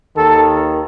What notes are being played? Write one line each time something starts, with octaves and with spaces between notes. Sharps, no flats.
D#2 D#3 A4